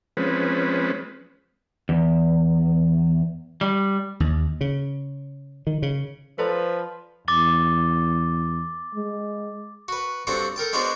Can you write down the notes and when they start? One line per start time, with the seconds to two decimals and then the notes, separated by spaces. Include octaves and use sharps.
0.17 F3 G#3 C4 C#4 B4
1.89 E2
3.61 G3
4.20 D#2
4.61 C#3
5.67 D#3
5.82 C#3
6.38 F3 A4 B4 C5 D5 A#5
7.28 E2 D6 A6 G7
8.95 G#3
9.88 F#4 B4
10.27 G2 C4 F#4 A4 A#5
10.56 A4 A#4 G5 A5
10.73 G#3 B3 D4 F#4 C5 D5